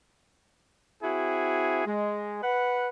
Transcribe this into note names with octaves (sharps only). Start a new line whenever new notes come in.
C4 E4 F#4 G#4
G#3
B4 F#5